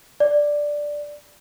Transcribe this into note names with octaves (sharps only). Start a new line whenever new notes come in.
D5